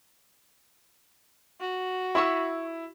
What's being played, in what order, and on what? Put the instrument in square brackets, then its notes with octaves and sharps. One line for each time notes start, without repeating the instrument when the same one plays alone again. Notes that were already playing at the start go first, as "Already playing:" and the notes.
[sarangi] F#4
[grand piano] E4 [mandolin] B5 C#6 E6